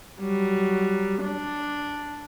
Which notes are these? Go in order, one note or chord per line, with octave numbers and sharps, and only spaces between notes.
F#3 G3
D4